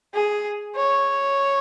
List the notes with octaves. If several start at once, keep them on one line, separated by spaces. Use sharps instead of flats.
G#4
C#5